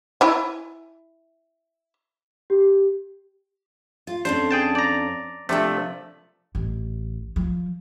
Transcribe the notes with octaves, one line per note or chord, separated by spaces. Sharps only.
E4 G#5
G4
F4
F2 C#4 D4 C5
G#4 G5 A5
D5 A#5
C3 F3 A3 D4 E5
A1
F3